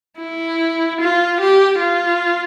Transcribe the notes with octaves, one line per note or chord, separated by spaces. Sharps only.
E4
F4
G4
F4